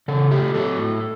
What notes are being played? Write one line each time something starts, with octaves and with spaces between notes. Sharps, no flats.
C#3 A4
A3 G4
F#3 A4
A2